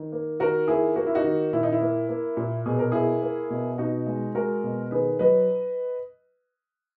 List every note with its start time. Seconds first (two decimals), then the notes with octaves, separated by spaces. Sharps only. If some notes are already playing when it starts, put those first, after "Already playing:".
Already playing: D#3
0.12 A#3
0.40 D#3 F#4 A#4
0.68 A#3 E4 G#4
0.96 A#3 F#4
1.07 E4
1.15 D#4 F#4
1.24 D#3
1.53 A#2 E4
1.63 D#4
1.72 E4
1.82 A#3
2.09 A#3
2.37 A#2
2.66 B2 G#4
2.79 A#4
2.92 A#3 E4 G#4
3.22 A#3
3.50 B2
3.78 B2 D#4 F#4
4.07 G#3
4.35 G#3 F#4 A#4
4.64 B2
4.91 D#3 G#4 B4
5.19 F#3 B4 D#5